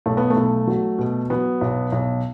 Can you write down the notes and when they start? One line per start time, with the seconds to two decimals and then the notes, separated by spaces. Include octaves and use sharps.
0.06 B1 A3
0.17 B3
0.30 A3
0.36 B1
0.67 F#3
0.98 B2
1.30 F#3 B3
1.61 B1
1.92 B1